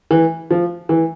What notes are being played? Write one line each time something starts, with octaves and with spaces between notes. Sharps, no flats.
E3
F3
E3